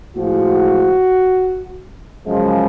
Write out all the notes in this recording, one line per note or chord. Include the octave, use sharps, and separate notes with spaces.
A2 F3 G#3 F#4
F#2 C#3 F3 G#3